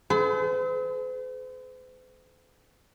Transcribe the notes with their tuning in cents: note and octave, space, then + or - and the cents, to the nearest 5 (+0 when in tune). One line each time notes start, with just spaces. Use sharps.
A4 -45 C5 -45